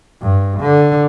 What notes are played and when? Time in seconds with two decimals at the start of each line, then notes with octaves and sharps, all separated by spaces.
0.22 G2
0.61 D3